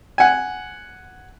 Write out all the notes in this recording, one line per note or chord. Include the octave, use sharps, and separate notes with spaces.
F#5 G#5